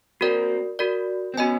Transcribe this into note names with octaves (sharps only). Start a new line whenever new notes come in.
A#3 C4 F#4 A#4 D5
F#4 A#4 D5
C4
B3 C#4 F#4 B4 D#5 G#5